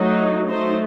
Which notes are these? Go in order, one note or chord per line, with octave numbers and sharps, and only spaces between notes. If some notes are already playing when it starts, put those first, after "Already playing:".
Already playing: F#3 A3 D#4
F#3 A3 D#4 C5